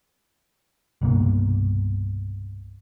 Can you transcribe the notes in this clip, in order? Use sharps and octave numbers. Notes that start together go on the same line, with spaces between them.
C2 G2 B2 A#3